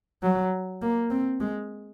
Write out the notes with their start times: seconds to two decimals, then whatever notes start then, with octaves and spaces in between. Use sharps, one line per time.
0.23 F#3
0.82 A#3
1.11 C4
1.41 G#3